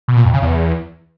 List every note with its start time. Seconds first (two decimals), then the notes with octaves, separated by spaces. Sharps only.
0.08 B2
0.17 A#2
0.25 F2
0.33 C#3
0.42 E2